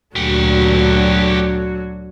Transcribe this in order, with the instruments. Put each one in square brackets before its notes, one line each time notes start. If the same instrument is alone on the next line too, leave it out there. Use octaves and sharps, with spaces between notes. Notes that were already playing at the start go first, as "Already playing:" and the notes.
[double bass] D2 A#2 [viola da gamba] D3 F#3 F#4 [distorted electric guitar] G4 F#5